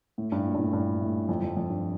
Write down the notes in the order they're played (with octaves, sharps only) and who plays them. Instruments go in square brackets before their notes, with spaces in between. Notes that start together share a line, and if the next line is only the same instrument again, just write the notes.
[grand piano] A2
G2
A#2
G2
A2
G2
A2
F2
F2
F2
G2